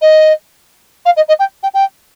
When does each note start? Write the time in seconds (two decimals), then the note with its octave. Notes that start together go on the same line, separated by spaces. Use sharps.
0.01 D#5
1.06 F5
1.17 D#5
1.28 D#5
1.39 G5
1.63 G5
1.74 G5